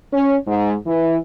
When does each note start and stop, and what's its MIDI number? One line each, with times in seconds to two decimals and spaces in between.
0.13 0.36 61
0.47 0.74 44
0.87 1.16 52